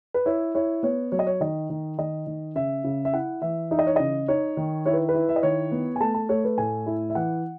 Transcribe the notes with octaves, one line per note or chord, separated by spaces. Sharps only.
B4
E4 C#5
E4 C#5
B3 C#5
F#3 C#5
D#5
C#5
D#3 D#5
D#3
D#3 D#5
D#3
C#3 E5
C#3
E5
E4 F#5
E3 E5
D#4 E5
D#5
C#5
C#3 D#5
D#4 C#5
D#3
E4 C#5
B4
B4
E4
E5
D#5
D#3 C#5
B3
G#5
A3 A5
A5
A3 C#5
B4
A2 G#5
E4
E5
E3 F#5